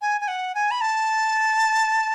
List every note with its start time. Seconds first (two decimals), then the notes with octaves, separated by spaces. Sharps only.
0.02 G#5
0.21 G#5
0.28 F#5
0.55 G#5
0.71 B5
0.81 A5